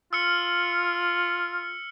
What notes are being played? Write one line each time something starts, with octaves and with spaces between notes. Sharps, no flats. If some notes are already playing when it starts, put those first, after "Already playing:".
F4 E6 F6 C#7